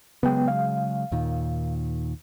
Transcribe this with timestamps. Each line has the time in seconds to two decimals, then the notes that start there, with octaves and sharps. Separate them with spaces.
0.23 C#3 F#3 G#3 B3 G5
0.48 F5
1.12 D#2 A#2 D#3